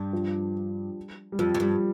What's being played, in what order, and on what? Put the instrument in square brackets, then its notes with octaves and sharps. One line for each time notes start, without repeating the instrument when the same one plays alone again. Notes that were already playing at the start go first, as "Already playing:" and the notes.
Already playing: [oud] G2
[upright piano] F3
G3
[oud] F2 [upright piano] F3
[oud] F2
[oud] G2 [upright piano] G3